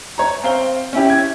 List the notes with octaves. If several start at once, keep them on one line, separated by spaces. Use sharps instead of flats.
C#5 A#5
C4 F5 G7
C#4 E4 G4
G#6